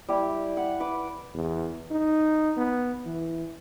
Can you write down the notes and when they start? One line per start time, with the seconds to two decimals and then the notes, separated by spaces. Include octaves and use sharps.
0.09 G3 E4 G4
0.57 F#5
0.80 B4 B5 D6
1.34 E2
1.91 D#4
2.57 B3
3.06 E3